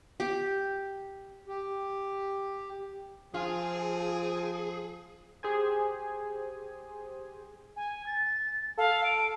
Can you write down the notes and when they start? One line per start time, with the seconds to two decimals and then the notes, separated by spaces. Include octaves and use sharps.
0.20 G4
1.46 G4
3.34 F3 C4 F4 G#4 G#5 D#6
5.43 G4 G#4 C5 G#5
7.76 G#5
8.06 A6
8.78 A4 F5
9.04 D7